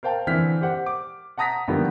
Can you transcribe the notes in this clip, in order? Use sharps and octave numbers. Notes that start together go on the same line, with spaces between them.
A#4 C5 F5 G5 A5
D3 E3 C4 F6 B6
G4 C5 F#5
D6
F#5 A5 A#5 D#6 A#6 B6
D3 D#3 F3 G3 A#3 B3